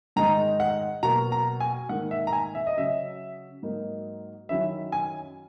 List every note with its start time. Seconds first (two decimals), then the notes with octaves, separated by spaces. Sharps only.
0.16 G#2 D#3 G#3 D#4 A#5
0.60 F#5
1.03 B2 F#3 A#3 A#5
1.32 A#5
1.60 G#5
1.89 G#2 D#3 A#3 F#5
2.11 E5
2.27 A#5
2.33 G#5
2.55 E5
2.67 D#5
2.76 C#3 F#3 C#4 E5
3.63 G#2 F#3 A#3 D#4
4.49 F#2 D#3 F#3 C#4 E4 E5
4.92 G#5